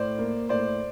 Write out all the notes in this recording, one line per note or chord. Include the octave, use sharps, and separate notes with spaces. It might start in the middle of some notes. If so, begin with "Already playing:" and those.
Already playing: A2 C5 D5
A#3
A2 C5 D5